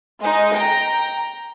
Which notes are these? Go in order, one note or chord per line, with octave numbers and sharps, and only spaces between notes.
G#3 D#4
G5 A#5